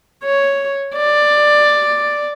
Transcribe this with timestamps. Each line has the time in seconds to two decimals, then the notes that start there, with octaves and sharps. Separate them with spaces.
0.24 C#5
0.97 D5